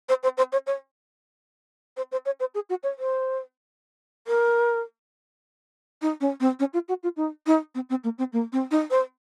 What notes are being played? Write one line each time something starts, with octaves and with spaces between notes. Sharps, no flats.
C5
C5
C5
C#5
C#5
C5
C5
C#5
C5
G#4
F#4
C#5
C5
A#4
D#4
C#4
C4
C#4
F4
F#4
F4
D#4
D#4
C4
C4
A#3
C4
A#3
C4
D#4
C5